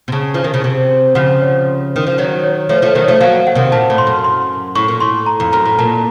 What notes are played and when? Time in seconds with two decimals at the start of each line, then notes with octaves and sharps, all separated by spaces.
0.08 C3
0.12 C#3 A5
0.34 F3
0.44 D#3
0.54 C#3
0.64 C3
1.15 C#3 F3 F#5
1.42 C#5
1.96 D#3
2.07 F3
2.18 D#3 F#3 C#5
2.44 C#5
2.69 F3 A3 C#5
2.82 F3 A3 C#5
2.95 D#3 F#3
3.04 F3 A3 C#5
3.21 F#3 A#3 F5
3.47 F#5
3.55 C3 D#3
3.72 A#2 A5
3.90 A2
3.98 C6
4.07 F#2
4.24 C6
4.75 A2 C#6
4.88 A#2
5.00 A2 C6
5.26 A#5
5.40 F2
5.52 F#2 A#5
5.66 A2
5.78 A#2 A5